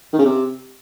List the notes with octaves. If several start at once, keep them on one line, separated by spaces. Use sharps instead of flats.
D#3
C#3
C3